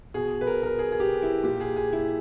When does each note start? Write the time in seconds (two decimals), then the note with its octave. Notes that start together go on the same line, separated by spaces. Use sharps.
0.14 B2 G#4
0.41 B4
0.47 A#4
0.63 A#4
0.79 G#4
0.92 G#4
1.00 G4
1.23 E4
1.43 A#2 G4
1.60 G#4
1.76 G#4
1.93 E4